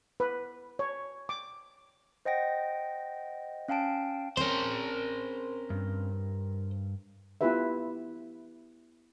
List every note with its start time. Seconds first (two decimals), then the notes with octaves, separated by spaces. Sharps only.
0.20 B4
0.79 C#5
1.29 D6
2.25 C5 D#5 F#5 G5 A#6
3.68 C#4 F5 G5 A5 D7
4.37 C4 C#4 A#4 C5
5.70 G2
7.41 B3 E4 F4 G4 B4 E5